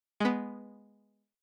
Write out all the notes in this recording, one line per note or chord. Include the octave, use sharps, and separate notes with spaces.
G#3 B3